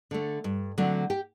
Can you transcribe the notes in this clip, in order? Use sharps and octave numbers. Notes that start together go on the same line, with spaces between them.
D3 A3
G2
D3 F#3 A3 C4
G4 G5